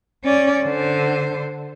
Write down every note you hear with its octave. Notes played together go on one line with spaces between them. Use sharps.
C#4 D5
D3 C5